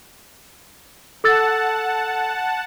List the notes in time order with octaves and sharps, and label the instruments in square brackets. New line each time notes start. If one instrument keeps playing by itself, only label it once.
[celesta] A4 E6 A6 [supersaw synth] F#5 A5